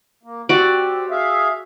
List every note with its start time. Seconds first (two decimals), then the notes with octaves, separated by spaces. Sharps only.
0.23 A#3
0.49 C4 F#4 G4 D5
1.11 G#4 E5 F5